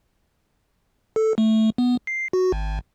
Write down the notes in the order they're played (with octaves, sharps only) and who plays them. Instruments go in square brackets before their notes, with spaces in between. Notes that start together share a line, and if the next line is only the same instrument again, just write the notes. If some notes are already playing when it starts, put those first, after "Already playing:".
[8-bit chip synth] A4
A3
B3
C7
F#4
G#1